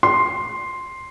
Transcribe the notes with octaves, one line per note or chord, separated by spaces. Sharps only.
C6